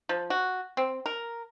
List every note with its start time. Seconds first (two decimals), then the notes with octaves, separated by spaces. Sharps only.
0.09 F3
0.30 F#4
0.77 C4
1.06 A#4